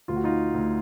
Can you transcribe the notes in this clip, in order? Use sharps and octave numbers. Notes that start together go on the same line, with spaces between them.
D2 F4
F#4
D#4 F4
D2